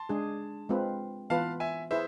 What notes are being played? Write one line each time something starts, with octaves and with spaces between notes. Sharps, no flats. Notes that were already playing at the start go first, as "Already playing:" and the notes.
Already playing: A5 C6
G#3 D4 G#4
G#3 C4 F4 B4
E3 B3 F4 B4 F5 A5
E5 G#5
E4 G#4 B4 C5 E5